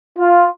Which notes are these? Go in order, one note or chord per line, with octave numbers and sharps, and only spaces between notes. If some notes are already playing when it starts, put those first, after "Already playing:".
F4